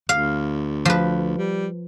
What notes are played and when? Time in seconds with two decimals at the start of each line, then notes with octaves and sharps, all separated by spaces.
0.09 D2 F5
0.85 F3 B4
1.38 G3